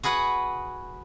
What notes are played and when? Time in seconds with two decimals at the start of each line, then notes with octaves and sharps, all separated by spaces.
0.03 F#4 G#4 B4 F#5